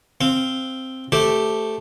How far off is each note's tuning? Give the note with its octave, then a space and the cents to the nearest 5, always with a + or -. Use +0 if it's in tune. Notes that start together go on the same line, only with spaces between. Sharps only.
C4 +0 F5 -10
A3 +0 G4 +0 C5 +0